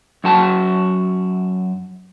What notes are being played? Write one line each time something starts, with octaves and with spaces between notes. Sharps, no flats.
F#2 F#4 A5